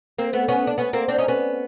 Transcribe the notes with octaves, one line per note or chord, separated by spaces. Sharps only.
A#3 C4
A3 B3
B3 C#4
D4
B3 C#4
A#3 C4
C4 D4
C#4 D#4
B3 C#4